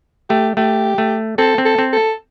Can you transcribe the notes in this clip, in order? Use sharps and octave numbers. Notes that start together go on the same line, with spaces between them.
A3 G4
A3 G4
A3
C4 A4
C4
A4
C4
A4